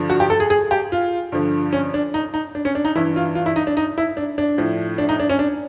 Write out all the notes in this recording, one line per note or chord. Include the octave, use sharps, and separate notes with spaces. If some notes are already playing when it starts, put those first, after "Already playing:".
Already playing: G2 D3 F3
F#4
G4
A4
G#4
G#4
G4
F4
G2 D3 F3
C#4
D4
D#4
D#4
D4
C#4
D4
D#4
G2 E3 E4
F4
F4
E4
D#4
D4
D#4
E4
D4
D4
A2 F3
D4
D#4
D4
C#4
D4